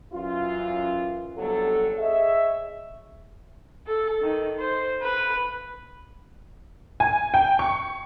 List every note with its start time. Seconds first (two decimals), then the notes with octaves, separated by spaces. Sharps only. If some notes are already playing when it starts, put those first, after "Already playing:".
0.13 F#2 E3 C#4 F4
1.37 G1 C2 F#3 A4
1.99 G#4 C#5 D#5 E5
3.86 A4
4.22 D#3
4.59 C5
5.02 B4
7.00 G#5
7.34 G5
7.59 C#6